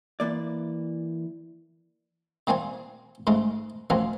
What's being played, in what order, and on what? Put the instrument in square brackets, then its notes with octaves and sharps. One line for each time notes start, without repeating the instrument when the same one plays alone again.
[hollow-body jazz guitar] E3 A#3 D5
[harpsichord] C3 G3 A#3 C4 G#5 C#6
G#2 C#3 G#3 A3
D2 F3 F#3 A#3 C4 C#4